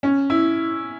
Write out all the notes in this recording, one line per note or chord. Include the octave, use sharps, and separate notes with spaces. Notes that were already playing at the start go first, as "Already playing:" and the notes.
C#4
E4